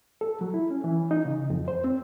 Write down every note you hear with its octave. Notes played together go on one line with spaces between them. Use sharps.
A4
F#3
E4
C#4
E3
D#4
C#3
F2
C5
C4